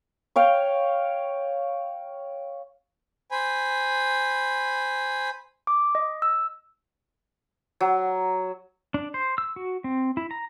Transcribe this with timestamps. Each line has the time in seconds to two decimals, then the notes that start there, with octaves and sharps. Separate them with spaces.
0.36 C#5 F5 G5
3.31 C5 G#5 B5
5.67 D6
5.95 D#5
6.22 E6
7.81 F#3
8.94 D4
9.14 C5
9.38 E6
9.56 F#4
9.84 C4
10.17 E4
10.31 A#5